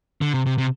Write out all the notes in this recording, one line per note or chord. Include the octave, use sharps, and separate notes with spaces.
D3
C3
C3
C3